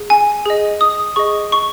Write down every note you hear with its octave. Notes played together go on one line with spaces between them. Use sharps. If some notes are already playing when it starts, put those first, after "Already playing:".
Already playing: G#4
G#5
G#4 D#5
D#6
G#4 D#5 C#6
C#6